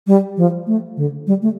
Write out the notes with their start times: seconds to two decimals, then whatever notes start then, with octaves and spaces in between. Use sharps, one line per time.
0.07 G3
0.37 F3
0.67 A3
0.97 D3
1.27 G3
1.42 A3